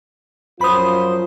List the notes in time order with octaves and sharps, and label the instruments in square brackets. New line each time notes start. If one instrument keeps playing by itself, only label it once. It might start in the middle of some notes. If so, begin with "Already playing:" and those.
[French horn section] F#2 F3 F4 [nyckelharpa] C5 [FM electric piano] B5 D#6